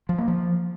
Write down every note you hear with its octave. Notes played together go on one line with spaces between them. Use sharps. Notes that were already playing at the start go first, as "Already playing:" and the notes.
F3
A#3
F3